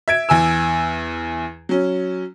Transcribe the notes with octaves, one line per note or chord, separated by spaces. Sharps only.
E5 G#6 D7
E2 G#5 E6
F#3 C#4